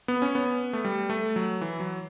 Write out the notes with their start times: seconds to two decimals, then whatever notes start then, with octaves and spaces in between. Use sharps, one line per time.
0.08 B3
0.22 C#4
0.35 B3
0.73 A3
0.84 G3
1.10 A3
1.36 F#3
1.61 E3
1.80 F#3